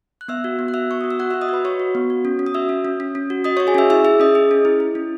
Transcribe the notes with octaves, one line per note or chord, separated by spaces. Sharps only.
F#6
B3 E5 E6
F#4
B3
F#6
F#4 E5 E6
B3 C#6
F#4 D#6
E6
F#4 F#5 F#6
E5 E6
F#4
D#5 D#6
F#4 B4 B5
F#4 C#5 C#6
F#4
B3
F#4
C#4
C#4
D#6
F#4 E5 E6
C#4
C#4
C#4
C#4
F#4
F#4 D#5 D#6
C#5 C#6
F#4
G#4 G#5
C#4 E5 E6
E4 E5 E6
G#4 E5 E6
C#4 D#5 D#6
G#4
C#4
E4
E4
C#4